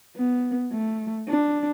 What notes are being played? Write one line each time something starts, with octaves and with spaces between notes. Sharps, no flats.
B3
A3
D4